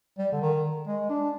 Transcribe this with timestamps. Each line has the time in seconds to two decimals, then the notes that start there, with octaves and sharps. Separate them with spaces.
0.18 G3
0.32 D3
0.41 D#3
0.87 G#3
1.09 D4